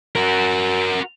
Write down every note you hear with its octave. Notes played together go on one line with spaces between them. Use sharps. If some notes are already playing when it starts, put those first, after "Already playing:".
F#4 A#4